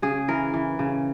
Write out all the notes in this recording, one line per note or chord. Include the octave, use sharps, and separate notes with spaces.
C#3 G#4
E3 A#4
E3
C#3